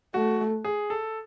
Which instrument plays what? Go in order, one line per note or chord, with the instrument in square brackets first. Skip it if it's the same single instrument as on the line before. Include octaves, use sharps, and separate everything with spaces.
[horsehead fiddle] A3 [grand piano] F#4
[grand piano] G#4
A4